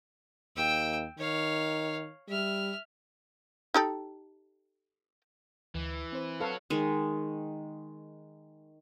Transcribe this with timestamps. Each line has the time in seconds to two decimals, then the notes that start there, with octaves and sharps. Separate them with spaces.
0.57 D#2 G5 E6
1.18 D#3 C#5 F5
2.29 G3 E5 F6
3.74 D#4 G4 A4
5.75 D2 E3
6.13 C4 C5
6.40 F#4 A4 B4 C#5 F5
6.70 D#3 G#3